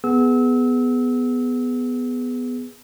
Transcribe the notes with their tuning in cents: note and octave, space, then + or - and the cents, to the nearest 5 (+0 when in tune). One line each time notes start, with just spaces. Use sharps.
B3 +5 G#4 +0 E6 -30